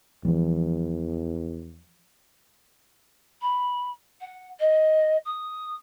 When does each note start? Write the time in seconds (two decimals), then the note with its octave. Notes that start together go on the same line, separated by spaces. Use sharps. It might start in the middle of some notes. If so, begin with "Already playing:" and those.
0.25 E2 E3 F3 G3
3.42 B5
4.21 F#5
4.60 D#5
5.25 D#6